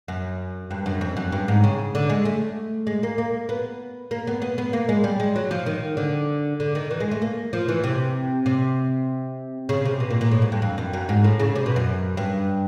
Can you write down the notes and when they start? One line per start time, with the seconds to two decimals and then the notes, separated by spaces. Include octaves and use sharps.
0.08 F#2
0.71 G2
0.86 F#2
1.01 F2
1.17 F#2
1.32 G2
1.48 G#2
1.64 C#3
1.95 D3
2.10 G#3
2.25 A3
2.87 G#3
3.03 A#3
3.18 A#3
3.49 B3
4.11 A#3
4.27 B3
4.42 B3
4.58 B3
4.73 A#3
4.89 G#3
5.04 G3
5.20 G#3
5.36 F#3
5.51 F3
5.66 D#3
5.97 D3
6.60 D3
6.75 D#3
6.91 E3
7.00 G#3
7.11 A3
7.22 A#3
7.53 F3
7.68 E3
7.84 C3
8.46 C3
9.69 C#3
9.85 C3
10.00 B2
10.11 A#2
10.21 A#2
10.32 A2
10.42 G#2
10.52 G2
10.62 F2
10.78 F#2
10.93 F#2
11.09 G#2
11.24 A2
11.40 C#3
11.56 C3
11.66 B2
11.76 F#2
12.17 G2